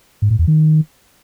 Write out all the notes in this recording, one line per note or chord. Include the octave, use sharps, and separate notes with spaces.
G#2
A2
E2
D#3